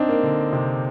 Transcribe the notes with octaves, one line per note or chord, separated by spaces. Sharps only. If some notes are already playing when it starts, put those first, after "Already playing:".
Already playing: C4 D4 D#4
A#3
D3
C3